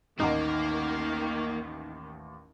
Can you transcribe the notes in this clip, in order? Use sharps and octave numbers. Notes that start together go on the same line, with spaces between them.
A1 D#2 D#3 A#3 D#4 F#5